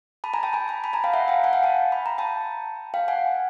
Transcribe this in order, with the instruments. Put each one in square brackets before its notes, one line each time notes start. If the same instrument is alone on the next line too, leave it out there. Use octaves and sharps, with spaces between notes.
[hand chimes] A5 B5
G#5 A#5
G5 A5
G#5 A#5
A5 B5
A5 B5
G#5 A#5
F5 G5
E5 F#5
F5 G5
F#5 G#5
F5 G5
G5 A5
B5
A#5
G5 A5
F5 G5
F#5 G#5